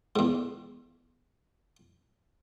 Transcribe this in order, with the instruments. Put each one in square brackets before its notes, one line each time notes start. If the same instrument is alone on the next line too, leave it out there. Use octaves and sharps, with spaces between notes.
[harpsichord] E2 G#2